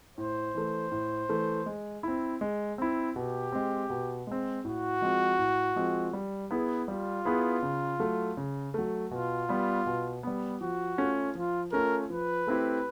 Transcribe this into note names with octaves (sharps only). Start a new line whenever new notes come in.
A2 C5
E3 A3
A2
E3 A3
G#3
C4 E4
G#3
C4 E4
B2 G4
G#3 C4
B2
G#3 C4
A2 F#4
F3 G#3 C4
A2
F3 G#3 C4
G3
B3 E4 G#4 B4
G3 F4
B3 E4 G#4 B4
C#3
F#3 A3
C#3
F#3 A3
B2 F4
G3 B3
B2
G3 B3
F3 F#4
A3 C#4 F4
F3 F4
A3 C#4 F4 A#4
F3 B4
A3 C4 E4 G4